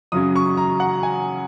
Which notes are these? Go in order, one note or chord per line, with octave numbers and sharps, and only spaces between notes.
F#2 C#3 F#3 C#4 D#6
C#6
A#5
F#5
G#5